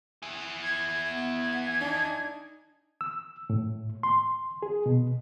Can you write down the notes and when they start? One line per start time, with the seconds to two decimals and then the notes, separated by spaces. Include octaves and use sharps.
0.23 E4 G#4
0.62 G#6
1.11 B3
1.81 D4 D#4
3.01 E6
3.50 A2
4.03 C6
4.62 G#4
4.86 B2